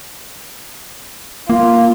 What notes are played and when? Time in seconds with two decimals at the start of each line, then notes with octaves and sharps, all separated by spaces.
1.50 A#3 F4